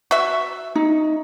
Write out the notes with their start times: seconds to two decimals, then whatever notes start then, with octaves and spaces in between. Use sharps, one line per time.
0.11 F#4 E5
0.75 D#4